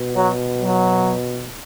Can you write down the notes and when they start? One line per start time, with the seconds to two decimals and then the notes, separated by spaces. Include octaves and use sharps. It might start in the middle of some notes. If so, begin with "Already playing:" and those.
Already playing: B2
0.15 F#3
0.60 F#3